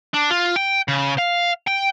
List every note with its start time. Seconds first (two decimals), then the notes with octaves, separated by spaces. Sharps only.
0.14 D4
0.30 F4
0.56 G5
0.88 C#3
1.18 F5
1.67 G5